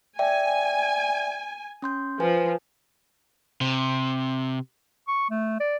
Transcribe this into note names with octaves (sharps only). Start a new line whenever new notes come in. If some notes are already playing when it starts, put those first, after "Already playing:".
D5 E5 G5 G#5
C#4 C6 G6
F3 B4 G#5
C3
C#6
A3
D5